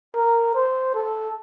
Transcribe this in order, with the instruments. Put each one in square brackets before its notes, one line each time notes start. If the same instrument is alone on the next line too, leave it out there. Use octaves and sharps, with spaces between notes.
[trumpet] A#4
C5
A4